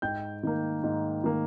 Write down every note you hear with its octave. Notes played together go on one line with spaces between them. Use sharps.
G#2 G5 G6
D#3 A#3
G#2
D#3 A#3